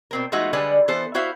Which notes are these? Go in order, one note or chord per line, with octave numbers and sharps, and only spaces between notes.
B2 C4 A#4
F3 G#3 A3 B3 D#4 F#4
D3 G3 G#3 B4 D5 G#5
E3 B3 A4 C5
E4 F#4 C5 E5 F5